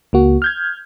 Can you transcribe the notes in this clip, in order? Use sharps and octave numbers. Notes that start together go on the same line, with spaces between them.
C#2 A#3 F#4
F6 G6 G#6